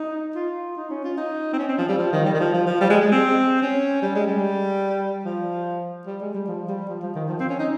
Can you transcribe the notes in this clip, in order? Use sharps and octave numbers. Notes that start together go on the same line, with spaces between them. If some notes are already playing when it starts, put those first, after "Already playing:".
Already playing: D#4
F4
D#4
C#4
F4
D#4
C4
C#4
C4
F3
G3
F3
D#3
G3
D#3
F3
F3
F3
G3
G#3
G#3
C4
C#4
G3
G#3
G3
F3
G3
G#3
G3
F3
G3
F3
F3
D#3
F3
C4
C#4
D#4